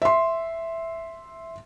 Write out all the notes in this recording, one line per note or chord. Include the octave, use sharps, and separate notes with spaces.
E5 C6